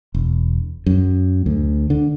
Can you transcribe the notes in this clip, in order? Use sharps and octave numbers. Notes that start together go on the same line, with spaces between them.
E1
F#2
D2
D3